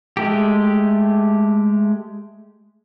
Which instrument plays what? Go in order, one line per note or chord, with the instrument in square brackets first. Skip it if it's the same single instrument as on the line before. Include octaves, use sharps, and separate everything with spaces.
[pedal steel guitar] G#3 A3 G4